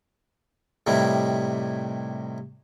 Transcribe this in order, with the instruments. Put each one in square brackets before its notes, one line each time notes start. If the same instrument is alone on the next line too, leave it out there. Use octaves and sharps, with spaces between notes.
[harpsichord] A2 C3 D#3 G3 E4